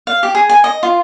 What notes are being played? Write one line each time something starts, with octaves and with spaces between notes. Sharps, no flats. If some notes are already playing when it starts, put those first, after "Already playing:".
F5
G4
G#4
G#5
D#5
F4